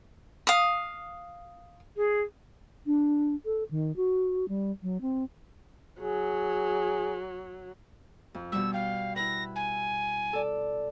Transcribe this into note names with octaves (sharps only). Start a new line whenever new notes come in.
F5 D#6
G#4
D4
A4
D#3
F#4
G3
F#3
C4
F#3 G#4
F2
B2 G3 E6
F5 G5
E4 B4 A#6
G#5
A4 D5